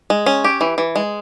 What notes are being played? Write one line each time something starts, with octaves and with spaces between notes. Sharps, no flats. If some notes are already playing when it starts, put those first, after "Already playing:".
G#3
C#4
G4
E3
E3
G#3